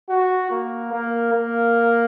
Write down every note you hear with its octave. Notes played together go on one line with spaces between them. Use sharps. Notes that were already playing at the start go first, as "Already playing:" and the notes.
F#4
A#3
A#3
A#3